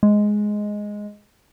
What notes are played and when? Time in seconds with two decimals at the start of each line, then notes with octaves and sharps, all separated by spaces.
0.03 G#3